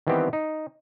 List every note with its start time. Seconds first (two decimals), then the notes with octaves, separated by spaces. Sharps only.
0.07 D#3 E3 G3 B3 C4 G4
0.33 D#4